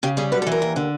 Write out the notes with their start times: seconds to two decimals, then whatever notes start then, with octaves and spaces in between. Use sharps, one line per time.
0.03 C#3 G4
0.17 G3 G#4
0.32 F#2 B4
0.42 A4
0.47 E3
0.52 A#4
0.62 D#2
0.76 D3